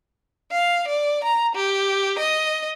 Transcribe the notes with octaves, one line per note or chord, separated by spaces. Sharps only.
F5
D5
A#5
G4
D#5